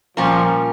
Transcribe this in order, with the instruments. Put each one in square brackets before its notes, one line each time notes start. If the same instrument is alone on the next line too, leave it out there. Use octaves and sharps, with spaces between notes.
[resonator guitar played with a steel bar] A#2 G3 C#4 F4 A#4 [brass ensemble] F3